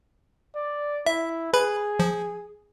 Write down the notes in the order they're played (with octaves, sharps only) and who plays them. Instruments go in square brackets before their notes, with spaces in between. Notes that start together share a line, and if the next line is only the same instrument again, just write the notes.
[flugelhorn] D5
[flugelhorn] E4 [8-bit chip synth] E5
[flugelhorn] G#4 [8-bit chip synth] B4 B5
[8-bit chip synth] F3